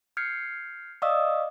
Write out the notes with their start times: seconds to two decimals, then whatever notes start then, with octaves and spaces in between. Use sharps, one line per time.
0.17 F6 G6 G#6 C7 C#7
1.02 D5 D#5 F5 C#6 D#6 E6